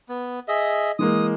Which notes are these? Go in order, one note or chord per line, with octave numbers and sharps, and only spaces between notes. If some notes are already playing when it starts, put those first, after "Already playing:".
B3
G#4 D#5 E5
E3 G#3 A#3 D#6